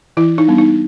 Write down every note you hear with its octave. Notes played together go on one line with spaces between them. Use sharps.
E3 E4
D#4
G3 B3 D4
D#4